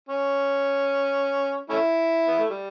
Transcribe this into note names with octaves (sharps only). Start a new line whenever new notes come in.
C#4
A3 C#4 E4
B3
A3
G3